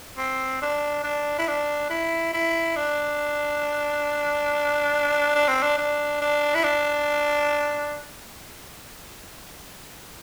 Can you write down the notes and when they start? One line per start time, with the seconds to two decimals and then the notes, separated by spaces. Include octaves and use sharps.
0.18 C4
0.62 D4
1.04 D4
1.39 E4
1.48 D4
1.90 E4
2.33 E4
2.76 D4
5.35 D4
5.48 C4
5.62 D4
5.78 D4
6.21 D4
6.55 E4
6.64 D4